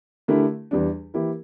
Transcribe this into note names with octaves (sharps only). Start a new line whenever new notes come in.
D3 A3 E4 G4 A#4
E2 E3 G3 D4
E3 A#3 E4 G4 A#4